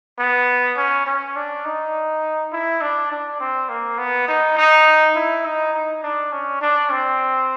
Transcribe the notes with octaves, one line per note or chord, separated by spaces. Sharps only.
B3
C#4
C#4
D4
D#4
E4
D4
D4
C4
A#3
B3
D#4
D#4
E4
D#4
D#4
D4
C#4
D4
C4